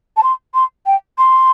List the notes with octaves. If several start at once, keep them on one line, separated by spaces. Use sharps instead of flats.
A5
C6
C6
G5
C6